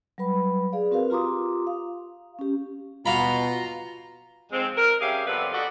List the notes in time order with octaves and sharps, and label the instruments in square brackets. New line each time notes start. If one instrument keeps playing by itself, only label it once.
[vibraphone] F#3 G3 B4 B5
G#4 D5 F5
C4 F#4 A#4 B4 F5
F4 G4 A#5 C6 D6 D#6
F5
C#4 G4
[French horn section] B2 [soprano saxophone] F4 [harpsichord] F#4 F5 B5 [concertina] A#5
[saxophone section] F2 G#2 G#3 C4
A#4
G3 C#4 G4 G#4 E5 F5
C3 F3 G3 B3 A4 B4
D#4 F#4 A4 B4 D5